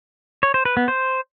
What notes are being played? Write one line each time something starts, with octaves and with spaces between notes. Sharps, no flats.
C#5
C5
B4
B3
C5